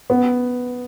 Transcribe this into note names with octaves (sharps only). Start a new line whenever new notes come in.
B3